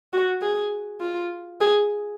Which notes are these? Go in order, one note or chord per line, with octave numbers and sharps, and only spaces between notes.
F#4
G#4
F4
G#4